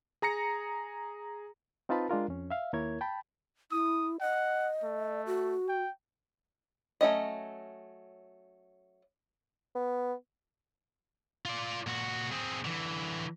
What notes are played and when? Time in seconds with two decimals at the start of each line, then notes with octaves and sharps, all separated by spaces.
0.22 G#4 A#5 A#6 C#7
1.89 C4 D#4 F4 B4 A5 B5
2.09 G#3 D4 F4 A#4
2.28 F2 C#4
2.51 E5 F5
2.73 D#2 A#3 E4 A#4 C#5 G#6
3.01 G5 A5 B5
3.72 E4 D#6
4.21 D#5 F#5
4.83 A3
5.27 F#4
5.69 G5
7.01 F#3 A3 C#4 D#5
9.75 B3
11.45 F4 D5
11.87 A#2 F#4
12.32 C4 G#4
12.65 D3 E3